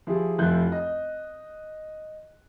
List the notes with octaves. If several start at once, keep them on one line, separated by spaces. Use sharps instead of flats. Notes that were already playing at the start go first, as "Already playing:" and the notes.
F3 E4 G4 G#4
F1 F3 E4 F#6 G6
D#5